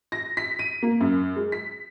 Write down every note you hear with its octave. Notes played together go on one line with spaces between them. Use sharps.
A#6
B6
D#7
A#3
F#2
G#3
B6